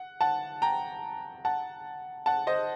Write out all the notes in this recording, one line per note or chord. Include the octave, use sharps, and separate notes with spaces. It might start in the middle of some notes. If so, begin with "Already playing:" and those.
Already playing: F#5
F#5 A5
G5 A#5
F#5 A5
F#5 A5
C5 D#5